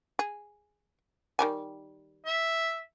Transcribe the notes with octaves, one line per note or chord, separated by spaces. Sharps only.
G#4
D#3 G3 G#5
E5